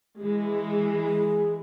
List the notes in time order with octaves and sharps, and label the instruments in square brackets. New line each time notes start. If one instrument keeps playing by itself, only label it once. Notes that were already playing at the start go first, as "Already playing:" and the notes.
[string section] E3 G#3
[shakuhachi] G#4